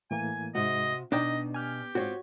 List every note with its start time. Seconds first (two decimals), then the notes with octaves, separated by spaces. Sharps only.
0.11 A2 E3 A#3 G#5
0.55 G#2 C3 F#4 D#5
1.12 B2 D4 D#4 D5 D#5 G5
1.54 G4 G#5 F6
1.95 G#2 C4 F4 F#4 C#5